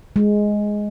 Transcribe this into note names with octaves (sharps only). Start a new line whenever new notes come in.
G#3